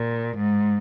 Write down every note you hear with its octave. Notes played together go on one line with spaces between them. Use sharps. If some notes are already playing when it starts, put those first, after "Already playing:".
Already playing: A#2
G#2